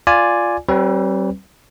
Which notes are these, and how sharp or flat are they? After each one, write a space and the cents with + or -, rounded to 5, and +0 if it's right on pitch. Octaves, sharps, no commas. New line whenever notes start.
F4 +0 D5 +0 G#5 +0
G3 -35 C4 +35 B4 +0